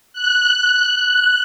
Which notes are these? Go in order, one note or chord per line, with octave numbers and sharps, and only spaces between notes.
F#6